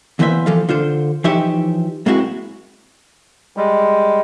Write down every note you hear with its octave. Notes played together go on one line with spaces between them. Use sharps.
E2 E3 A#3 C5 D#5 E5
E3 F3 A4 F5
D3 F4 C5
E3 F3 D#4 G4 C#5 E5
G#2 G#3 A#3 C4 E4 F#4
G3 G#3